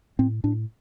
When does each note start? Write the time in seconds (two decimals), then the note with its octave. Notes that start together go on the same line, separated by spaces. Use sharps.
0.19 A2 C4
0.44 A2 D4